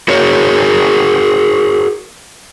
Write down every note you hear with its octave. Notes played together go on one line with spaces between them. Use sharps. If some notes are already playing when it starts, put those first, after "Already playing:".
F#4 G#4 A#4 C#5